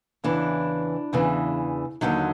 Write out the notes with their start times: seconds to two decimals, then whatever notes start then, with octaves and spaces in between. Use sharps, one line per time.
0.24 E2 C#3 E3 D4
1.13 E2 C#3 E3
2.01 D#2 D3 F#3 D#4